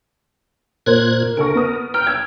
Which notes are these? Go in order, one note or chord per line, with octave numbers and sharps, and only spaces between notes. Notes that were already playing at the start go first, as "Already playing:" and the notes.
A#2 A#3 A#4 C5 F#6 G#6
D2 A4 A#4 C#6
B3 D#6
G5 A#5 F6 D7
E6 G#6